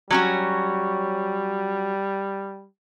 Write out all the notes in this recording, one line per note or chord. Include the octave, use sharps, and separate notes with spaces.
F#3 G3 C#4 F#4